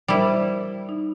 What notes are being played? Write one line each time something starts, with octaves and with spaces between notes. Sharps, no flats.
G3 E4 A#4 C5
D#4